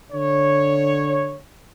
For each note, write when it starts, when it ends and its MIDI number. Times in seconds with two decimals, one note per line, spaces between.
0.13 1.37 50
0.13 1.37 73